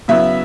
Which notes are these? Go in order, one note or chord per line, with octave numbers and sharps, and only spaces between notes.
C#3 F#3 B3 E4 E5